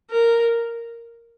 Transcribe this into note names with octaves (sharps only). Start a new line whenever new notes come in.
A#4